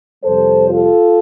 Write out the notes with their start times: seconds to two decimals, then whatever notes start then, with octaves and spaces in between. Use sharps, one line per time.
0.22 F2 C3 G3 A4 C5
0.69 F4 A4